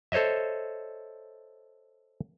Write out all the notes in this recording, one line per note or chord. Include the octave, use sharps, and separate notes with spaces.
A4 C5 C#5 D#5 E5